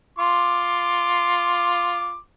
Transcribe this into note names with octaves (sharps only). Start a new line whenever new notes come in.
F4 C6 D6